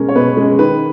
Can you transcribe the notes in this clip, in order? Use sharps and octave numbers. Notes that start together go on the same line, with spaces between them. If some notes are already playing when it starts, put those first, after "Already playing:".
Already playing: B2 G#3 C#4 A#4
C#5
B2 B4
G#3 C#4
D#3 B4